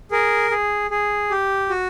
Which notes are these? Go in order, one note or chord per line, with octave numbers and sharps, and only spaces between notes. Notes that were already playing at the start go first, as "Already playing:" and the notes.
G#4 A#4
G#4
G#4
G4
F#4